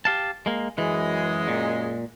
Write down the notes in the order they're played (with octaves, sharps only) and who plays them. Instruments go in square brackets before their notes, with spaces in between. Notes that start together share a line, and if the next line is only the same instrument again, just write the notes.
[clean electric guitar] G4 F5 A5
G#3 A#3
[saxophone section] F#2 G#3 [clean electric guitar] E3
[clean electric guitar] A#2